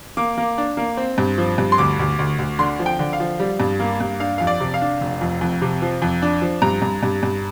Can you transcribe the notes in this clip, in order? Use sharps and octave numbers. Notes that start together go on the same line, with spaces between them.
A#3 D6
A#3
D4
A#3
C4
G2
F3
G2
C6
D2 D6
D2
D2
D2
D3 C6
F3
G5
D3
F5
F3
G3
G2
A#3
G2
D4 F5
F2 F5
D5
C3
F5
D4
F1
F2
F2
C3
F3
F2
D4
F3
G2 A#5
G2
G2
G2